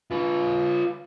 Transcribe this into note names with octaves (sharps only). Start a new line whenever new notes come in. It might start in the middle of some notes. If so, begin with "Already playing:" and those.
F4 B4